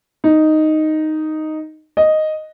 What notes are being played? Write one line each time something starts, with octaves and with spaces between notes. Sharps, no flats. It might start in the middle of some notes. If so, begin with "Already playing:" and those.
D#4
D#5